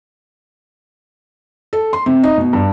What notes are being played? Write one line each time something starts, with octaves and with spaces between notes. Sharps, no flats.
A4
C6
C3
D#4
B2
G2